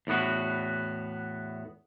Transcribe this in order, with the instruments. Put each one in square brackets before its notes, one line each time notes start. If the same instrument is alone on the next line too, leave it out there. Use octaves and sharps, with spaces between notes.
[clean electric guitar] E2 A2 B3 F#4